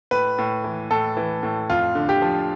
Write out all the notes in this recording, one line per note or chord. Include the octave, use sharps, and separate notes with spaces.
A2 B4
A2
E3
A2 A4
E3
A2
F2 F4
D3
G4
F3